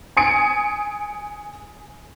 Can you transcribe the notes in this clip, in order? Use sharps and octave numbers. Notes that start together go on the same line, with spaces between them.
G#5 D#6 C#7 D7